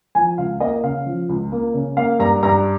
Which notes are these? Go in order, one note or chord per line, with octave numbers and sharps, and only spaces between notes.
F3 G#5
C#2 F5
A#3 D#5
C#3 F5
F3
C#2
A#3
C#3
A#3 F5
G2 A#5
G2 A#5